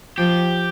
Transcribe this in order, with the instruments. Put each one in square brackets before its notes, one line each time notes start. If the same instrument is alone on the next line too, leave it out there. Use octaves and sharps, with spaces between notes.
[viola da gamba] F3 [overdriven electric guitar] G4